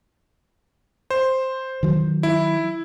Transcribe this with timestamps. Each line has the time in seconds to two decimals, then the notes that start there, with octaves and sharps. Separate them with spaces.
1.10 C5
1.83 D#3 F#3
2.23 E4